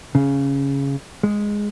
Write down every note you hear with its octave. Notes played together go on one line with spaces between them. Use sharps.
C#3
G#3